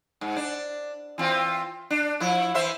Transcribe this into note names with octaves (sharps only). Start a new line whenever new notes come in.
G#2
D4
E3 C4 F4
D4
F3 E4
E3 C5 E5